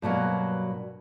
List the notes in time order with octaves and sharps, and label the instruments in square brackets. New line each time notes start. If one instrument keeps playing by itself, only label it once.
[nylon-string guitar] G2 B2 F#3 A#3